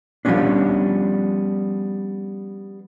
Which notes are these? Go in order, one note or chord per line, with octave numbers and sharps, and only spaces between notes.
F3 G3 A#3 B3 C#4 D4